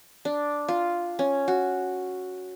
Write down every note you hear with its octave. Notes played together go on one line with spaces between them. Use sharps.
D4
F4
C#4
F#4